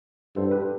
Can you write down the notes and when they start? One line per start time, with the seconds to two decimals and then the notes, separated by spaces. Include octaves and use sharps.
0.36 G2 A4 C5
0.51 G4 B4